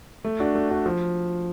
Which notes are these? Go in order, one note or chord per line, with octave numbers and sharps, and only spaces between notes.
A3
D4 F#4
A3
D4 F#4
F3